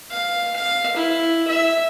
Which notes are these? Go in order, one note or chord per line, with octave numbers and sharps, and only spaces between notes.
F5
F5
E4
E5